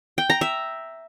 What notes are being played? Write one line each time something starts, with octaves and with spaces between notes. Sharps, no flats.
G5
A#5
E5